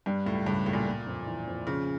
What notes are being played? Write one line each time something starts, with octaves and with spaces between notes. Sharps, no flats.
G2 G3
C#2 A2
G2 C#3
C#2 A2
A#2
A#3
F2
E3
F2
C#3 F3